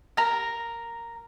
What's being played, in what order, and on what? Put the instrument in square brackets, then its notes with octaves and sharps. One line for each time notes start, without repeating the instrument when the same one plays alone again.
[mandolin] A#4 A#5